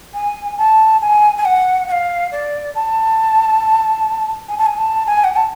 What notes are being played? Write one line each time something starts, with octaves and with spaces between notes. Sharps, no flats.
G#5
A5
G#5
G#5
F#5
F#5
F5
D5
A5
G#5
A5
G#5
A5
G#5
F#5
A5